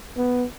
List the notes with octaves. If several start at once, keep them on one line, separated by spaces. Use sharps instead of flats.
B3